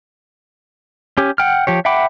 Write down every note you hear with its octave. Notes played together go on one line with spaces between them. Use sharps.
C#4 G4
F#5 G5 F6
F3 G4 C#5
E5 F#5 G5 B5 D6